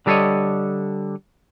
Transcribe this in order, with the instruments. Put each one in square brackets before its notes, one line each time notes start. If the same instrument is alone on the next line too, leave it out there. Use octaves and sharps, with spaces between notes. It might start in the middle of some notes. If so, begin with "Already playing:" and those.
[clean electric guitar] D3 G3 A4 C5 C#5 D#5